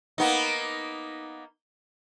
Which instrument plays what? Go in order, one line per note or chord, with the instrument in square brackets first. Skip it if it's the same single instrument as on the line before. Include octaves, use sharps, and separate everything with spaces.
[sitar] A#3 B3 D#4